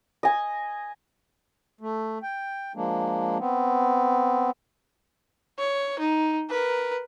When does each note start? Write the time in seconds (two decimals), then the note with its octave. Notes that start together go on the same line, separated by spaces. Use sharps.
0.23 D#5 G#5
1.81 A3
2.23 G5
2.75 F3 G#3 A#3 D4
3.39 B3 C4
5.58 C#5
5.99 D#4
6.50 A#4 B4